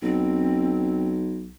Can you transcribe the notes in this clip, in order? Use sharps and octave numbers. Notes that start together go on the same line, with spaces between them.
B1 C4